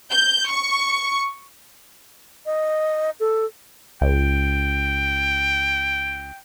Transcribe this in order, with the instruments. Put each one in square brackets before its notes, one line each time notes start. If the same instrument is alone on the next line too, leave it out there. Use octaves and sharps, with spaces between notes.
[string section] G6
C#6
[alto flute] D#5
A4
[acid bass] C#2 [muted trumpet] G5